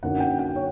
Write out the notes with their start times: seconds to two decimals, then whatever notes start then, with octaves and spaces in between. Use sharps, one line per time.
0.03 F#2 D3 F#3 A#3 D#4 F#5
0.20 G5
0.39 G5
0.56 C#5